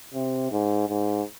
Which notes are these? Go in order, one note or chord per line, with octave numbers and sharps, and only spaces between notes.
C3
G#2
G#2